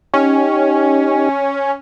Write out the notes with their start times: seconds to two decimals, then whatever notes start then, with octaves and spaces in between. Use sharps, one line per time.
0.14 C#4 D#4 G4